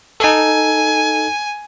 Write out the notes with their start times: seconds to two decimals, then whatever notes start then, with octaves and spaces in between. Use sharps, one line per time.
0.20 D#4 A4 G#5